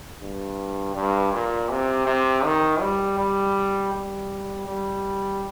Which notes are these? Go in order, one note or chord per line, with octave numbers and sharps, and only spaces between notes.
G2
G2
A#2
C3
C3
D#3
G3
G3
G3
G3